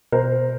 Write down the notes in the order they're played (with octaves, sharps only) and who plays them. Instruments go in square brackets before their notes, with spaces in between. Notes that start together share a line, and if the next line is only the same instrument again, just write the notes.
[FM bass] B2 [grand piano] A#4 C5